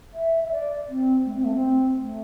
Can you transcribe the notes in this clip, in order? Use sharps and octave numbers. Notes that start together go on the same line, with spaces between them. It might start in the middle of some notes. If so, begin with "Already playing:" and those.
E5
E5
D5
C4
A3
C4
A3
C4
A3